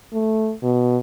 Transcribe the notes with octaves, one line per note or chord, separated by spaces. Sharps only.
A3
B2